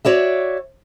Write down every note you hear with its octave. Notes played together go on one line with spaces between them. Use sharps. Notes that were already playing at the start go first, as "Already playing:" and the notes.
F#4 C#5 D5 E5